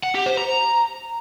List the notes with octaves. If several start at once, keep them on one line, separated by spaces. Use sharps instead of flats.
F#5
G4
C5
A#5